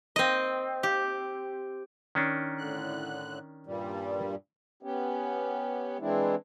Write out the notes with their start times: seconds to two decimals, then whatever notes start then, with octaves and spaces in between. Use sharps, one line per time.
0.16 C4 D#5
0.83 G4
2.15 D#3 C#4 D4
2.58 A2 D3 F#6
3.67 G2 A#2 G3
4.83 B3 C#4 G4
6.00 E3 G#3 C4 D4 E4